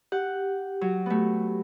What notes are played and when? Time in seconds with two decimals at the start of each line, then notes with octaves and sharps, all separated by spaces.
0.12 G4 F#5
0.81 F#3
1.06 A3 B3